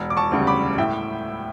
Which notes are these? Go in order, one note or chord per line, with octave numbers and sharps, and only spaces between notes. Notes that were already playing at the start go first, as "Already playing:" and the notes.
Already playing: E1
D6
A5 C#6
D2 C#3 G3
B5 D6
A2 E5 G5